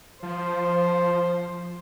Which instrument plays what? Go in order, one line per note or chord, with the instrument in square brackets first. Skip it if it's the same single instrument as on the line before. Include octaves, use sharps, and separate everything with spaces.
[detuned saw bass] F3 [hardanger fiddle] C5